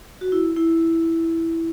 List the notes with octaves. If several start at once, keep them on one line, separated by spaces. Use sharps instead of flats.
F#4
E4
E4